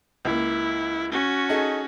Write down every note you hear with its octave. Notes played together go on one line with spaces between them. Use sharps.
C#2 A#3 E4
C#4 F#4
D#4 G#4 A4